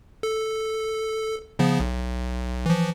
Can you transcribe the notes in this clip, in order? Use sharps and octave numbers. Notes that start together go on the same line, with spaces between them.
A4
C#3 F3 B3
B1
E3 F3